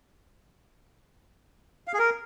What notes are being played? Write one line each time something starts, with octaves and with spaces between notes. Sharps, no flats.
F5
G#4
A#4